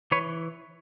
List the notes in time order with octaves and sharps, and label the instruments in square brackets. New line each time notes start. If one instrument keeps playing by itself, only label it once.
[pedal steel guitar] E3 B4 C#5